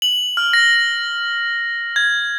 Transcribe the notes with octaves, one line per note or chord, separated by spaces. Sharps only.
F#7
F6
A#6
G#6